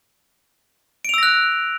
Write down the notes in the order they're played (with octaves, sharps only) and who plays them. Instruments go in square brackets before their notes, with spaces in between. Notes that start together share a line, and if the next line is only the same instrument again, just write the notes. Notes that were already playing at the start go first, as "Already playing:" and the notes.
[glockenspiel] D7
F7
E6
A#6
F#6